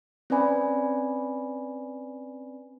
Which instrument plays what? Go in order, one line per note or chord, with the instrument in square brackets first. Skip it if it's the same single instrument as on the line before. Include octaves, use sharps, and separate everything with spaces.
[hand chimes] C4 C#4 B4 D5 G#5 B5